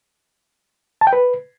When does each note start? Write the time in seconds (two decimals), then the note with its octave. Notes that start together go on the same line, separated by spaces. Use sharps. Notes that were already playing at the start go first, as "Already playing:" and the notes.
1.01 A5
1.07 G5
1.13 B4